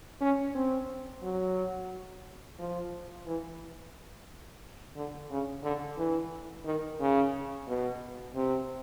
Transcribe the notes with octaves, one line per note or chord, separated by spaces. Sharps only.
C#4
C4
F#3
F3
E3
D3
C#3
D3
E3
D#3
C#3
B2
C3